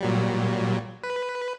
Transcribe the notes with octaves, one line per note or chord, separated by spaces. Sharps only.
A#2 F#3 G3
B4